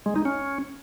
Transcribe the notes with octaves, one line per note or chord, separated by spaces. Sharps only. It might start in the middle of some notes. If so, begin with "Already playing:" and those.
G#3
D#4
C#4